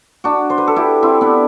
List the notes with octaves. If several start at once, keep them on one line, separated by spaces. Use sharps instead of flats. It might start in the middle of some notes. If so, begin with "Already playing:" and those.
D4 F#4
C5
B4
A4
E4 G4
C4 E4
B3 D4